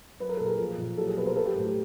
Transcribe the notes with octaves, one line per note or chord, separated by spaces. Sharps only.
F#3 B4
A#4
A#2 A4
G#4 A#4
F3
A#2
F#3 G4 A4
G#4
B2 A4 B4
A#4 C5
F#3 A4 B4
G4
A2
G4